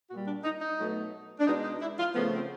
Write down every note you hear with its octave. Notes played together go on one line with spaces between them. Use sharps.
A#2 G3 F#4
D4
D#4
D#4
B2 F#3 A3
D4
B2 G#3 D#4
D#4
E4
F4
C#3 F3 A3 B3
C4